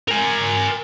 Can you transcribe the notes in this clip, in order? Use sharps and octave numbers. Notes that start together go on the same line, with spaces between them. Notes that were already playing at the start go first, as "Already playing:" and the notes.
A#4 G#5